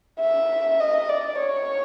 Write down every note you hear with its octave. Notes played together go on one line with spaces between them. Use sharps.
E5
D#5
D5
C#5